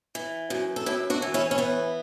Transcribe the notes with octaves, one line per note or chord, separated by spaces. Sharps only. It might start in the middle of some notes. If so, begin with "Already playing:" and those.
E3
F#2
A4
F#2 E4 G4
D4 F#4
E3
C#4 E4
C#4
E3 B3